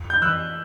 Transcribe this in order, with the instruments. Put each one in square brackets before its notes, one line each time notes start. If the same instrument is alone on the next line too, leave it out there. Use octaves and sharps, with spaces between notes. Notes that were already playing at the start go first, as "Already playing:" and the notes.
Already playing: [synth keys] F2
[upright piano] G6
[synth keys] E3 [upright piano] E6 F#6